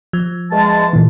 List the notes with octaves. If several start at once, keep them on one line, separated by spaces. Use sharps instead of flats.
F3
E2 G#3 A5
A#2 E3